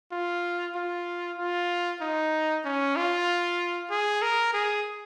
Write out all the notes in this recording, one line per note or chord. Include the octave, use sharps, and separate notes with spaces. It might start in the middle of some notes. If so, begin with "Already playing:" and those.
F4
F4
F4
D#4
C#4
F4
G#4
A#4
G#4